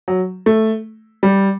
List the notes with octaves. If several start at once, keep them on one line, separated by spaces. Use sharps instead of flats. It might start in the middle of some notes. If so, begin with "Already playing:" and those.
F#3
A3
G3